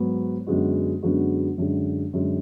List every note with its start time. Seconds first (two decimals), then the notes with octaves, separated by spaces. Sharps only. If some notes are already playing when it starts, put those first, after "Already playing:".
Already playing: G#2 F#3 B3
0.47 F#2 D3 G#3 B3 F#4
1.03 F#2 D3 G#3 B3 F#4
1.58 F#2 D3 G#3
2.13 F#2 D3 G#3